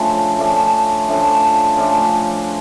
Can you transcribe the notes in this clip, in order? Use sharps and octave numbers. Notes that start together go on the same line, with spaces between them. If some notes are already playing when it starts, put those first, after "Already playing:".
Already playing: C#3 F3 A3 D4
C#3 F3 A3 D4
C#3 F3 A3 D4
C#3 F3 A3 D4